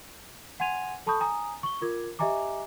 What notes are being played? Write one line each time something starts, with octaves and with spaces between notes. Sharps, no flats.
F#5 G#5 C6 G#6 D#7 F7
A4 A5 B5 C#6 D#6 G6
G#5 A#5 D#6
C#6 G7
F4 A#4 D6 G#6
G4 D#5 E5 G#5 A#5 D6